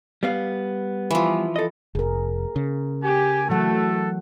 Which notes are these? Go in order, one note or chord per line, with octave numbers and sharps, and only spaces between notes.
G3 B3 F5
E3 F3
A4 D#5
F1 G#4 A#4
C#3
G4 G#5
E3 F#3 A3 A4 F#5